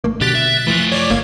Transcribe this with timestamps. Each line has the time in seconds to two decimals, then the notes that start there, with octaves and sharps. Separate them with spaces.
0.04 G#1 A3 A#3
0.21 B2 D3 F#3 G4 F#6 A6 B6
0.35 E5
0.67 E3 F3 A3 F4
0.92 C#5 D5 D6
1.10 G1 A#3 G#6